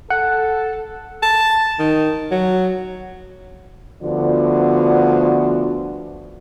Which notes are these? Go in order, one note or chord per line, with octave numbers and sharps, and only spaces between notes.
A4 F#5
A5
D#3
F#3
D2 D3 F3 B3 F#4 D5